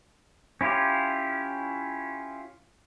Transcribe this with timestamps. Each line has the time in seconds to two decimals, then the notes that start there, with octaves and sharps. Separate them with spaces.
0.61 C#4 E4 F4 G4